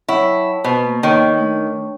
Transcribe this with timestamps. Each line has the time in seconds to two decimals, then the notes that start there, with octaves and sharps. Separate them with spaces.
0.08 F#3 E4 C#5 F#5 G5 A5 C#6
0.64 B2 B4 C5
0.83 A#3
1.03 D#3 C#5 G5 C#6
1.37 A3 D4